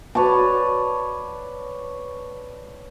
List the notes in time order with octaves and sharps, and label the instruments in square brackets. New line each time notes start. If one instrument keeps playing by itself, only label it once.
[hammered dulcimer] B4 C#5 D5 A5